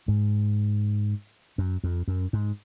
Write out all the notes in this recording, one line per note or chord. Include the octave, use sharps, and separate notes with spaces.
G#2
F#2
F2
F#2
G#2